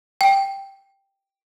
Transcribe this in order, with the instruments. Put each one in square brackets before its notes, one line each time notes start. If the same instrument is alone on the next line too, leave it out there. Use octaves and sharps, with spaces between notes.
[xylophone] G5